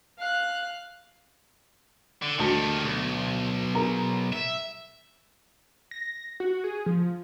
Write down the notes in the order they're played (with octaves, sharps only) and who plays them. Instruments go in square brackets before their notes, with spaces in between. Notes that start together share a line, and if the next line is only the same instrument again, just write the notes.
[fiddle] F5 F#6
[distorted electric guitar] D3
[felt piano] D2 A5 C#7 [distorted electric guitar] D#3 G3
[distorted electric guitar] B1
[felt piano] G#4 A#4 A#5
[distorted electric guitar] E5
[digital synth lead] A#6
F#4
G#4
F3